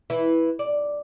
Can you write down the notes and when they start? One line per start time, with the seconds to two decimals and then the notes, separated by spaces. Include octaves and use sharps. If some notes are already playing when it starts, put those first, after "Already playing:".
0.10 E3 E4
0.59 D5